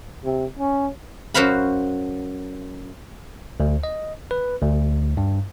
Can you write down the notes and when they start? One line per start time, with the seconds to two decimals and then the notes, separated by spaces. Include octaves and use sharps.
0.24 C3
0.59 C#4
1.34 F#2 F#4 C5 F5 B5
3.60 D2
3.83 D#5
4.31 B4
4.61 D2
5.17 G2